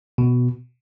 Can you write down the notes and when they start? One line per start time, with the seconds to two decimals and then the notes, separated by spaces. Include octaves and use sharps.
0.18 B2